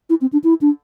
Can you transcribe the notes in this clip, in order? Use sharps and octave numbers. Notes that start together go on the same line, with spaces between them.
E4
C4
D4
E4
D4